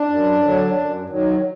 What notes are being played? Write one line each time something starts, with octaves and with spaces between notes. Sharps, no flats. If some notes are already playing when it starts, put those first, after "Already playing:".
Already playing: D4
F#2
D3 F#3
F#2
D#3 F#3